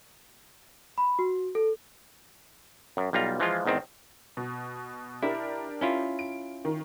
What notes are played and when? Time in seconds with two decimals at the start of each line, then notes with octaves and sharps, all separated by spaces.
0.98 B5
1.19 F#4
1.55 A4
2.97 F#2
3.13 B1 G3 F4 A#5
3.40 E3 F3 G#3 F4
3.66 E2 G#2 D#3 C4
4.37 B2
5.23 D4 E4 G4 A#4
5.81 C#4 E4 F4
6.19 D7
6.65 D#3